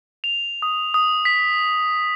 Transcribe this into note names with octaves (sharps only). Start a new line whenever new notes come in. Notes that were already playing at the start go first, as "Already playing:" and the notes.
F7
D#6
D#6
B6